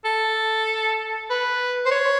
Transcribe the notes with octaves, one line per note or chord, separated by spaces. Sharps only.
A4
B4
C5
C#5